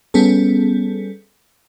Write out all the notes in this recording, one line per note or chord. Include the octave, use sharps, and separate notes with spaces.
G3 B3 C#4 G#4 A4